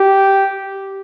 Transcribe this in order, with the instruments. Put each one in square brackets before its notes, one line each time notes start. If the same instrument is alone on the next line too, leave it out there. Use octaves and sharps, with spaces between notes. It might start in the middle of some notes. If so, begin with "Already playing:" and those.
Already playing: [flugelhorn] G4